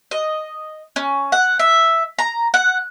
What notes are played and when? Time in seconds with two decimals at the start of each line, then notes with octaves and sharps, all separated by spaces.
0.11 D#5
0.96 C#4
1.32 F#5
1.59 E5
2.19 A#5
2.54 F#5